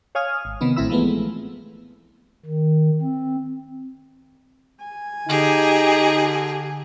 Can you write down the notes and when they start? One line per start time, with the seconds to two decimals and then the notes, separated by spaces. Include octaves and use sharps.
0.15 C#5 F5 G#5 D#6 F6
0.45 G#1
0.61 C3 D#3 B3 D#4
0.76 A#1 A2 C4 E4 B5 E6
0.90 E3 F3 G#3 A3 B3
2.46 D#3
3.01 C4
4.85 G#5
5.27 D3 D#4 G4 G#4 D#5